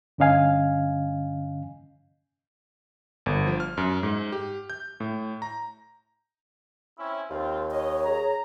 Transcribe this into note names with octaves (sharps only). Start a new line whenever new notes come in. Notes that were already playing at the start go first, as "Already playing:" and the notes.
G2 D3 C#4 D#5 F5 G#5
G1
F3
F6
F#2
G#2
G4
G6
A2
A#5
C4 C#4 E4
D#2 C4 F4 A#4
C#5 D#5
G#4 A#5